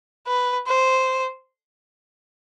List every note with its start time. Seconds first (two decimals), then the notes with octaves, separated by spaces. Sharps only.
0.27 B4
0.67 C5